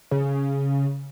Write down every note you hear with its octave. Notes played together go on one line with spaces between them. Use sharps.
C#3